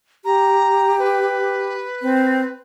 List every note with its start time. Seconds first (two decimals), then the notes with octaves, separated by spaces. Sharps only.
0.25 G4 A#5
0.99 B4
2.02 C4